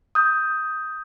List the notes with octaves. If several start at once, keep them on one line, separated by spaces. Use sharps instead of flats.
D#6 G6